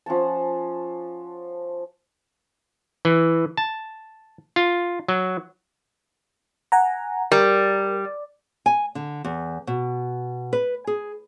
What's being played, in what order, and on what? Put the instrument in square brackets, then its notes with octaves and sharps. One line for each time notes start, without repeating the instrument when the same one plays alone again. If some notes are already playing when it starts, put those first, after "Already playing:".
[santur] F3 C#4 F#5 A5
[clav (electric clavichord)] E3
A5
F4
F#3
[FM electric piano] F#5 G#5 A#5
[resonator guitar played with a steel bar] G3 [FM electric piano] A#4
[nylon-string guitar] G#5
D3
E2
B2
B4
G#4